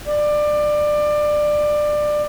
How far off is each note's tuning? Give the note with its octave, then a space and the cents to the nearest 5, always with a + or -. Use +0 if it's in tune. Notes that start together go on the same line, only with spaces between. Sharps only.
D5 +20